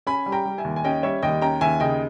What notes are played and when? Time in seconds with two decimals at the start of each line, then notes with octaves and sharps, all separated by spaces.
0.07 C#4 G#5 B5
0.26 G3
0.32 G5 A#5
0.45 G3
0.58 E5 G#5
0.64 D#2
0.76 G#5
0.84 C#4 D#5 G5
1.03 G3 C#5 E5
1.22 D#2 D#5 G5
1.41 C#4 G5 A#5
1.61 D#2 E5 G#5
1.80 C#3 D#5 G5